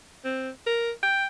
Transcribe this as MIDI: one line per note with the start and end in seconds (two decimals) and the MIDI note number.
0.25 0.50 60
0.67 0.91 70
1.03 1.26 79